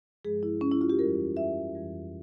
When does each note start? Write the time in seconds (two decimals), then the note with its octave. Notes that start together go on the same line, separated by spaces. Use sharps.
0.25 G2 F3 G#3 G#4
0.43 E4
0.61 C#4
0.71 E4
0.81 F4
0.90 G4
0.99 F2 E3 G3 A#4
1.37 E5
1.75 F2 E3 G3